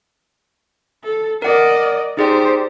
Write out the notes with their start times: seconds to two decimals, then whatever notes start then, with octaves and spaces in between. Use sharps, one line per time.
1.04 A4
1.42 A#4 D5 D#5 F#5
2.17 D#4 G4 G#4 C5 D5